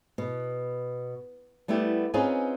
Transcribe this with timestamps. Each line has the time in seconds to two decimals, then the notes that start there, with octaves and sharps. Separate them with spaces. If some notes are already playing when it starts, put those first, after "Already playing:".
0.18 B2
1.68 G3 A3 B3 E4 G4
2.14 C4 C#4 D#4 F4 G#4 B4